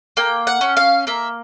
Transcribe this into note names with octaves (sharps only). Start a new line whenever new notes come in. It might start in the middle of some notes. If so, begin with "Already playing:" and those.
A#3 G5
F#5
C#4
F5
A#3 E5